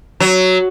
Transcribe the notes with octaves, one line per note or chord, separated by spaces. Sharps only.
F#3